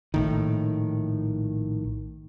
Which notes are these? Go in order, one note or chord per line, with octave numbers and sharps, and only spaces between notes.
A#1 A2 D#3